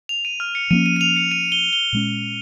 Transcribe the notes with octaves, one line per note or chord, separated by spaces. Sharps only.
F7
D#7
F6
C#7
F3 A#3 C#4 D#7
D#7
D#7
F7
C#7
D#7
G7
G7
A#2 G#3 C#4